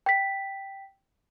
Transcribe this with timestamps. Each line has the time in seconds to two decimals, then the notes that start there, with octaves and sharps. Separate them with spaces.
0.06 G5 B6